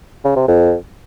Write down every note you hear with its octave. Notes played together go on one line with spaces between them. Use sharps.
C#3
C3
F2